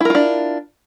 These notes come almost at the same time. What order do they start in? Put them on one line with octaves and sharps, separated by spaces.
E4 A#4 F4 D4